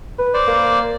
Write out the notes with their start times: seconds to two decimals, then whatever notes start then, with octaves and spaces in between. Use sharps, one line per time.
0.18 B4
0.34 C5 D5
0.47 A#3